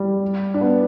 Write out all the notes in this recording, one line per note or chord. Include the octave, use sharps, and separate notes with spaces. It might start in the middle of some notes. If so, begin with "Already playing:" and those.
Already playing: G3
D4
B3